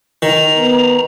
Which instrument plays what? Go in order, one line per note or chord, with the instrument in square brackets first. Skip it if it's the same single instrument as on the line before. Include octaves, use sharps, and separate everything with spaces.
[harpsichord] D#3 [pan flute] A#5
[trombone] B3